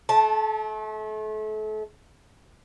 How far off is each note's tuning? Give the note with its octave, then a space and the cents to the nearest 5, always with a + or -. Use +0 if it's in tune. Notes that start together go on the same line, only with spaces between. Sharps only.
A3 -35 A5 +0